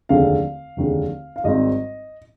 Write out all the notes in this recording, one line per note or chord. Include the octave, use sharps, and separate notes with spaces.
F1 D#2 D3 G#3 F5
F1 D#2 D3 G#3
F5
G#1 G#2 G3 C4 D#5